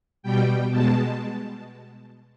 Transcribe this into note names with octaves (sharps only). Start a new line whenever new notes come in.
B2 G3 G5
B2 G#3 A5